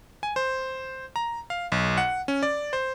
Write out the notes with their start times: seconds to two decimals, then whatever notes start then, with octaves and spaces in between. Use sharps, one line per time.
0.23 G#5
0.36 C5
1.16 A#5
1.50 F5
1.72 B1
1.97 F#5
2.28 C#4
2.43 D5
2.73 C5